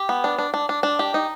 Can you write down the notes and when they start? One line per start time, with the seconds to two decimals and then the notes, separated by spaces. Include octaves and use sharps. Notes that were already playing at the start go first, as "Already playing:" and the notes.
Already playing: G4
0.09 B3
0.24 D4
0.38 D4
0.54 D4
0.69 D4
0.83 D4
0.99 G4
1.14 D#4